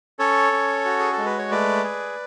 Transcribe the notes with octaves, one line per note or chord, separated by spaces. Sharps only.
C#4 A4 C#5
C#4
F#4
G#4
A4
G#3
B4
C#5
A3 B4 D5
G#4